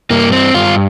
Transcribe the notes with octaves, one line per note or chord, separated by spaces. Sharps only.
G2 A#3
C4
G2 F4